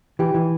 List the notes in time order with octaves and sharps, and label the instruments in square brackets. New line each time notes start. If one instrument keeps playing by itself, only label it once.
[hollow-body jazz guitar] E3 G4
E3